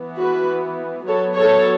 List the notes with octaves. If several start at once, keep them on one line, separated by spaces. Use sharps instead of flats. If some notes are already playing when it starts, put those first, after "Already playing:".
Already playing: E3 B3
F#4 B4
F#3 B3 A4 C#5
A4 C#5